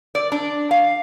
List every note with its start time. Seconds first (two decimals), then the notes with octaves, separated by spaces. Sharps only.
0.15 D5
0.32 D4
0.71 F5